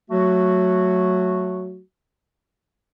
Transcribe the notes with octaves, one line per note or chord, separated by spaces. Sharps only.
F#3 A3 F#4